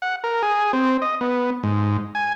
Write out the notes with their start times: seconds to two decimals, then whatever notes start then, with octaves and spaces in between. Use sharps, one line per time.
0.02 F#5
0.24 A#4
0.43 G#4
0.73 C4
1.02 D#5
1.21 B3
1.63 G#2
2.15 G#5